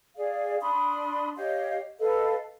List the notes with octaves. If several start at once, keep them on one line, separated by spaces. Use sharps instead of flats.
G#4 D5 F5
D4 B5 C6 D#6
G4 C#5 D#5 F5
A4 B4 D#5 F5